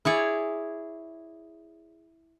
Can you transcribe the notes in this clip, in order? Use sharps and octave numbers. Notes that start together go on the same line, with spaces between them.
E4 G#4 C#5 D5